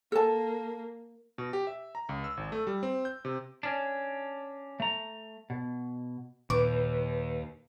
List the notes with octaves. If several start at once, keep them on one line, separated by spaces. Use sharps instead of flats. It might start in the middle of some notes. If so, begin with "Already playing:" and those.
A#3 A4 A5
B2
G4
E5
A#5
C#2
E6
G#1
A3
G3
C4
G6
C3
C#4 D4
A3 A#5
B2
D#2 A#2 B4 D6